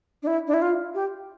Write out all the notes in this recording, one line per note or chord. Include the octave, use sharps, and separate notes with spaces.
D4
E4
D4
E4
F4
G4